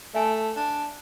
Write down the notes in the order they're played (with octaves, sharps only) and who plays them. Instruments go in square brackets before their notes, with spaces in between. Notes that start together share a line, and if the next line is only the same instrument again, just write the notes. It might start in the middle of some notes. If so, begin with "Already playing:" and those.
[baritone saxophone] A3 [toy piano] E5 G#5 A5
[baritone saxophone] D4